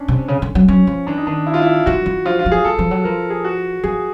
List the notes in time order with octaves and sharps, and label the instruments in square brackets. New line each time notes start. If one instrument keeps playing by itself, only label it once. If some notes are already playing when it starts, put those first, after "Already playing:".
Already playing: [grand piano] C#4 D4
[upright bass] C3
C#3
D3
F#3
[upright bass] F#3 [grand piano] C#4
[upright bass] F3
[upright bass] E3 [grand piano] D4
[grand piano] D#4
[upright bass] D#3 [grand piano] D4
[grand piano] E4
F4
E4
[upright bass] E3 [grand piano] F#4
[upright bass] E3
[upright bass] F3 [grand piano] F4
[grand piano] F4
[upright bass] F3
[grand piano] G#4
[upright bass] F3 [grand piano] A4
[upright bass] F3
F#3
[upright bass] F3 [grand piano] A#4
[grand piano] G#4
F#4
[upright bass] F3 [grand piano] G#4